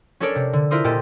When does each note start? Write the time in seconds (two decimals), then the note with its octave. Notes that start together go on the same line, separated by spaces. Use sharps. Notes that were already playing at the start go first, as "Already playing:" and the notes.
0.20 C#4 D4 A4 A#4 C#5 D5
0.35 C3
0.53 D3
0.71 E4 F4 A#4 C5 D#6
0.84 A#2 A#3 G4 A4 D#5